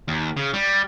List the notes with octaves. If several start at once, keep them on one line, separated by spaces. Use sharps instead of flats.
D#2
C#3
G3